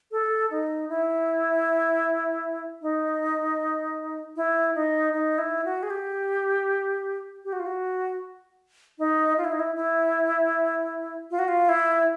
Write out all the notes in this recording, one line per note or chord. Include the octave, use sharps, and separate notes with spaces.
A4
D#4
E4
D#4
E4
D#4
D#4
E4
F#4
G#4
G4
G4
F#4
F4
F#4
D#4
F4
E4
D#4
E4
E4
F4
F#4
F4
E4